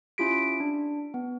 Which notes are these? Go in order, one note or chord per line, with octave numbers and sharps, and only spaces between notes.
C#4 E4 F4 G4 B6 D7
D4
B3